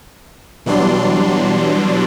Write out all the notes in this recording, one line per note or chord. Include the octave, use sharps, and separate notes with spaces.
B2 E3 F#3 G3 D4 C6